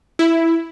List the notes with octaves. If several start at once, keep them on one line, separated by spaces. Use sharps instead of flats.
E4